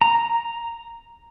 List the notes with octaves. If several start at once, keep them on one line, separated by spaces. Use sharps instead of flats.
A#5